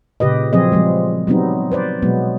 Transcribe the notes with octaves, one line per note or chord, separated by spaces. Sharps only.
A#2 C#3 G4 B4 D#5
F3 F#3 C4 G#4 D#5
F3 G3 G#3
F#3 G3 B3 C4 D#4
B4 C5 D5
B2 F#3 G#3 B3